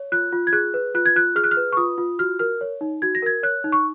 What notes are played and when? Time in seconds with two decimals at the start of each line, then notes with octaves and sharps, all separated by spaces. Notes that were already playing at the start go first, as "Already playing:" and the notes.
Already playing: C#5
0.12 F4 F#6
0.32 F4
0.47 G#6
0.53 G#4 F#6
0.74 B4
0.94 F4 F#6
1.06 G#6
1.16 F4 F#6
1.36 G#4 F6
1.44 F#6
1.51 F6
1.57 B4
1.73 C#6
1.77 F4 D#6
1.98 F4
2.19 F#4 F6
2.39 A#4 F6
2.61 C#5
2.81 D#4
3.02 F#4 G#6
3.15 A#6
3.22 A#4 G#6
3.43 C#5 F#6
3.64 D#4
3.72 C#6